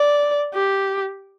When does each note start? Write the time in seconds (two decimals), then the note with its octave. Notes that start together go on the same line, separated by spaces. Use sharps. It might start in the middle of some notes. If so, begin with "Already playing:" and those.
Already playing: D5
0.54 G4